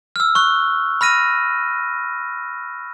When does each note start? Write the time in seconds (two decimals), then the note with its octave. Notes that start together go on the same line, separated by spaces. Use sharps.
0.16 E6 F6
0.35 C#6 F#6
1.01 B5 F6 A#6 D#7